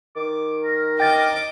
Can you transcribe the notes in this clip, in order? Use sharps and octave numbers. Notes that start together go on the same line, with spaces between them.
D#3 D6
A#4
D#5 G5 D6 A6